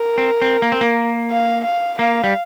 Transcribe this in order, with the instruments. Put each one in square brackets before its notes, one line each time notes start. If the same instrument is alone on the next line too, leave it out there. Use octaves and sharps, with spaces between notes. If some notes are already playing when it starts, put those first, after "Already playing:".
Already playing: [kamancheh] A#4
[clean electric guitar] C4
C4
A#3
C4
A#3
[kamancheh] F5
F5
[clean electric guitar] A#3 [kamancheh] F5
[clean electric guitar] G3